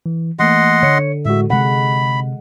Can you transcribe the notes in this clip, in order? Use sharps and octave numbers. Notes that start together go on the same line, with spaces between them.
E3
E3 A3 A#3 D#5 F#5 C6
D3 C#5 C#7
A2 G#3 F#4 E5
C3 G#3 F#5 B5